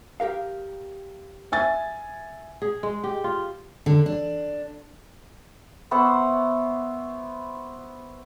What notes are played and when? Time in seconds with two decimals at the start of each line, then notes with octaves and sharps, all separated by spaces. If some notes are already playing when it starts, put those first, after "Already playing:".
0.20 G4 A#4 F5
1.52 E5 G#5 A6
2.62 G#4
2.83 G#3
3.04 G4
3.24 F4
3.86 D3
4.06 D4
5.91 B3 C5 E5 C#6